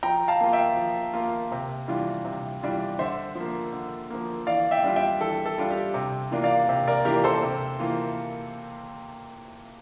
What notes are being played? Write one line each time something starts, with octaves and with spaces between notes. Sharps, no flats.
F3 G5 A#5
F5 A5
A#3 F4
E5 G5
F3
A#3 F4
C3
E3 G3 D4 F4
C3
E3 G3 D4 F4
D3 C5 E5
F3
A#3
D3
F3 A#3
E3 D5 F5
E5 G5
G3 D4 F4
E5 G5
E3 A4
A4
G3 D4 F4
G4
C3
E3 A#3 D4 F4
D5 F5
C3
A#4 D5
E3 A#3 D4 F4 G4 A#4
A4 C5
C3
E3 A#3 F4